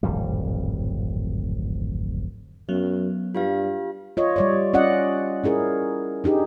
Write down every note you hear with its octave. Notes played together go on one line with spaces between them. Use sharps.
D1 G#1 F2 G3
F#2 F#3 B3
G2 F4 G4 F5
F4 C#5 D#5
G3 C#5 D5
C#4 F4 D5 D#5 F#5
C#4 E4 G#4 A#4
D4 D#4 G4 G#4